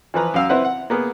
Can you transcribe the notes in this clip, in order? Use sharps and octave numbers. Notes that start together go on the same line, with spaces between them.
E3 F3 B4 A#5
F#2 F5 E6
C4 E4 B4 F#5
F#5
A#3 B3 G#4